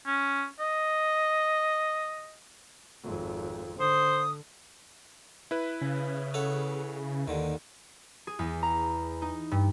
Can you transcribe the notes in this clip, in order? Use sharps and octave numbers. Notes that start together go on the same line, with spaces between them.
C#4
D#5
G#1 F2
D3 C5 D#6
E4 B4
C#3
A4 C#5 F#5
D#2 D3 D#3
G#4
E2
A#5
D#4
G2